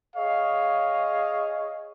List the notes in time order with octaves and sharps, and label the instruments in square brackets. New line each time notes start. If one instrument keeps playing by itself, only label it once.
[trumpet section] G#4 C#5 D#5 F5